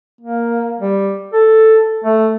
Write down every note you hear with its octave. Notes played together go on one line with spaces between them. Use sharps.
A#3
G3
A4
A3